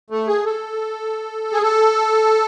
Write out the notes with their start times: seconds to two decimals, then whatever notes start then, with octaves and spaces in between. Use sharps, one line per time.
0.10 A3
0.27 G#4
0.45 A4
1.52 G#4
1.62 A4